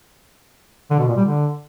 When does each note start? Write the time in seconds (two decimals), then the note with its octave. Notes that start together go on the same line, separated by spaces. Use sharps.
0.90 D3
0.99 B2
1.08 A#2
1.17 G3
1.26 D3